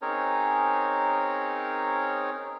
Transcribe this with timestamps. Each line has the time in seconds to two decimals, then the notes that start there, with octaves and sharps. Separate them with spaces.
0.02 C4 C#4 D#4 G#4 A#4 C#5